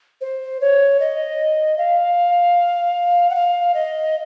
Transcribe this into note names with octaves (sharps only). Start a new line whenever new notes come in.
C5
C#5
D#5
F5
F#5
F5
D#5